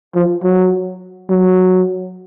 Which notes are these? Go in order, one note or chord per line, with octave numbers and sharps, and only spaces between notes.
F3
F#3
F#3